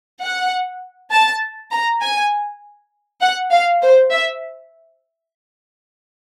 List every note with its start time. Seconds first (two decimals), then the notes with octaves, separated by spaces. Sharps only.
0.22 F#5
1.12 A5
1.72 A#5
2.02 G#5
3.22 F#5
3.52 F5
3.82 C5
4.12 E5